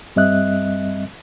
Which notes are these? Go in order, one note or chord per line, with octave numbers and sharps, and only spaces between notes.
G2 G3 C4 D#5 E5 F#6